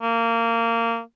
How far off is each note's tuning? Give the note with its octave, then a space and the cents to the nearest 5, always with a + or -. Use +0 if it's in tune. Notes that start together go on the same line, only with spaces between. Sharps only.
A#3 -20